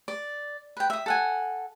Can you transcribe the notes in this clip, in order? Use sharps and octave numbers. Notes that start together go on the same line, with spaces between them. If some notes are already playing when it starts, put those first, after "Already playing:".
D5
B4 G5
E5 D#6
A4 F#5 G#5